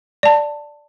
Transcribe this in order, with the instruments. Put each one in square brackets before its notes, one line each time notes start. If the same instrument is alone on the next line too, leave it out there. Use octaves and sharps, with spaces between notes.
[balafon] D5 A5